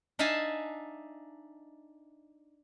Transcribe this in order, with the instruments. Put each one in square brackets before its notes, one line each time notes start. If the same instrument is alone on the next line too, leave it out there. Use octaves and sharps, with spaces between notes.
[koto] D4 D#4 E5 F5 G#5 A5